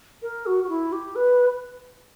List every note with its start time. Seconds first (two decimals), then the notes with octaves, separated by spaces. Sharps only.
0.22 A#4
0.46 F#4
0.64 F#4
0.69 E4
0.92 G4
1.16 B4